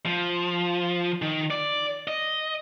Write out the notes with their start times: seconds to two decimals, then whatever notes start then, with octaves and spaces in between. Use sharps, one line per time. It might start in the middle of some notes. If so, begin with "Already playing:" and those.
0.06 F3
1.22 D#3
1.51 D5
2.08 D#5